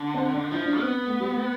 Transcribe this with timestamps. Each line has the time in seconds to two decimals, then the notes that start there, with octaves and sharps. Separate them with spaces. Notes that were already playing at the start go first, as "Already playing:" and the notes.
Already playing: D3
0.14 C4
0.33 D4
0.51 F3 E4
0.65 D4
0.79 B3 C4
1.07 A3
1.20 G3
1.34 A3